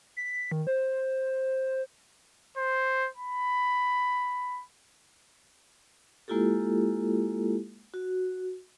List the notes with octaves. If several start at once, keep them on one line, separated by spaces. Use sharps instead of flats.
B6
D#3
C5
C5
B5
G#3 A#3 E4 F4 G4 A4
F#4